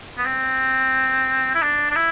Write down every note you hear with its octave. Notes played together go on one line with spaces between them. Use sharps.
B3
C4
E4
D4
D4
E4